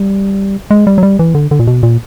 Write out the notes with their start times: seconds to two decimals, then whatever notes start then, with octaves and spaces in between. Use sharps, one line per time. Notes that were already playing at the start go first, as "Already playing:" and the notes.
Already playing: G3
0.71 G#3
0.87 G3
0.98 F#3
1.03 G3
1.19 E3
1.35 D3
1.51 D3
1.59 A#2
1.67 B2
1.83 A#2